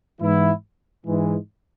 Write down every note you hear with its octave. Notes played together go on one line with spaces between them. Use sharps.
G#2 E3 B3 E4
G#2 E3 G#3